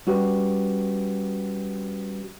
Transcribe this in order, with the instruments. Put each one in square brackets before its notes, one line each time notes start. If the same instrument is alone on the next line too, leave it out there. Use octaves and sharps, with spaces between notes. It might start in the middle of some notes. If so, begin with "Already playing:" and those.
[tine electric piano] G3 C#4 F#4 G4 B4